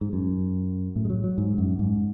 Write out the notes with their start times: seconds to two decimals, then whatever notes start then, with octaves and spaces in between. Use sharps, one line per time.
0.01 G#2
0.13 F#2
0.96 A2
1.05 G#3
1.10 F#3
1.24 F#3
1.38 G#2
1.58 F#2
1.79 G#2